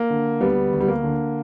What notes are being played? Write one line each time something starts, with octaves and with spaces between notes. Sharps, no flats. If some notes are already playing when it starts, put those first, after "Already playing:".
Already playing: A#3
D3
D2 G3 B3
D2
G3
A#3
D3